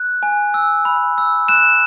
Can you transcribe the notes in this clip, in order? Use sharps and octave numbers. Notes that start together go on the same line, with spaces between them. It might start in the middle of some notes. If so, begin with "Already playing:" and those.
Already playing: F#6
G#5
E6
B5
E6
F#6 E7